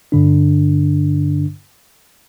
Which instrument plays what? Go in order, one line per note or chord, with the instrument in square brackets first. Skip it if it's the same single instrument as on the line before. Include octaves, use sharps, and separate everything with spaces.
[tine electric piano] G2 D3 D4